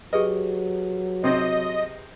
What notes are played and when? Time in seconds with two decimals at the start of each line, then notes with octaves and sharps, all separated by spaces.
0.13 F#3 G4 G#4 B4 D#5
1.24 C3 C4 D#5